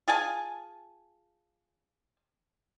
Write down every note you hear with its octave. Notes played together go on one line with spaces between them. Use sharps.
F4 G#4 G#5 A5